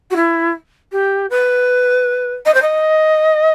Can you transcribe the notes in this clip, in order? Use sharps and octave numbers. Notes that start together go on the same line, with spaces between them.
F#4
E4
G4
B4
D#5
C5
D#5